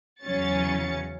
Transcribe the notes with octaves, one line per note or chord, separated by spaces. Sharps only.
E2 C#3 F#3 C#4 A6 C#7